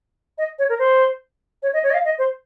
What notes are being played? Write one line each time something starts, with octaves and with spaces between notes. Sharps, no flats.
D#5
C#5
A#4
C5
C#5
D#5
C#5
D#5
F5
D#5
C5